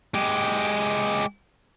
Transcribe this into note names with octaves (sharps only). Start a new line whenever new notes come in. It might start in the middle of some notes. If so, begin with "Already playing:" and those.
G#3 G4